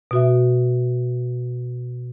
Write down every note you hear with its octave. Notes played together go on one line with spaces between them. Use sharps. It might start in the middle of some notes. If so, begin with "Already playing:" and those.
B2 F#4 E5